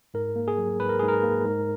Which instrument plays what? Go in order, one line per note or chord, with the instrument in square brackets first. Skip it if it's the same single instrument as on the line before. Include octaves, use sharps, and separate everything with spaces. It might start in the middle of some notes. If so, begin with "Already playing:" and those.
[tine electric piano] G#2 A#4
A#3
G#4
F#3
G#2 B4
A#4
G#2 G#4
A#4
A#3
G#2